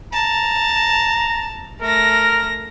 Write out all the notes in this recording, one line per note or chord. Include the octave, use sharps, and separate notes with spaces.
A5 A#5
A3 A#4 A#6